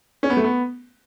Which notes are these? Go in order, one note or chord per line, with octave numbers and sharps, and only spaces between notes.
C#4
B3
A3
B3